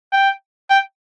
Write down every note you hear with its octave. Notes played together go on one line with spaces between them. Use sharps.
G5
G5